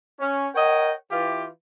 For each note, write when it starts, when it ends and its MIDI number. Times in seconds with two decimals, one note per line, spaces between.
0.20 0.48 61
0.54 0.91 70
0.54 0.91 73
0.54 0.91 75
0.54 0.91 78
0.54 0.91 79
1.11 1.46 52
1.11 1.46 65
1.11 1.46 67